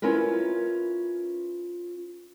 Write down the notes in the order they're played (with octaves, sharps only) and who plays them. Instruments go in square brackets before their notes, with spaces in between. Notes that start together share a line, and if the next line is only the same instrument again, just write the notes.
[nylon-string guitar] C#4 E4 F4 A#4 B4